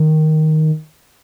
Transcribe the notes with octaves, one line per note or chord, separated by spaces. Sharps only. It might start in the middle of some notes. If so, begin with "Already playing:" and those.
Already playing: D#3